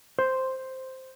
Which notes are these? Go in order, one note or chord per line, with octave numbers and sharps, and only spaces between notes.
C5